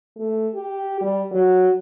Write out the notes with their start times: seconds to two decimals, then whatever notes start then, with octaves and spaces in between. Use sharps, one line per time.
0.16 A3
0.54 G4
1.01 G3
1.31 F#3